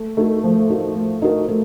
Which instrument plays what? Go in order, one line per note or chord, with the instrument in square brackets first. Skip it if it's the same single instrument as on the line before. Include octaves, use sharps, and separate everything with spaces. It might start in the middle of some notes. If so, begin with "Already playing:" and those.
Already playing: [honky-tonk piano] A3
[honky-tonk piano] A3 [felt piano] D#4 F#4 A#4
[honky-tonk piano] F3 [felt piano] A3
[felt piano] D#4 F#4 A#4
A3
D#4 F#4 A#4
A3